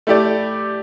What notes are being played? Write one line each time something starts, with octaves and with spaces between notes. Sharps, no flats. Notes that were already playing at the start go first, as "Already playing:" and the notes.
A3 E4 G4 D5